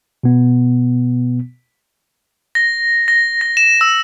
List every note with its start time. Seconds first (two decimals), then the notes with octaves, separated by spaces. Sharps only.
0.23 B2 B3
2.55 A#6
3.08 A#6
3.41 A#6
3.57 E7
3.81 E6